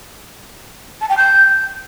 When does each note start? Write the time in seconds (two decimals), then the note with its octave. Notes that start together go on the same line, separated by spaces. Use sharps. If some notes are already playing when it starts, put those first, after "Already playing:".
1.01 A5
1.09 G5
1.17 G6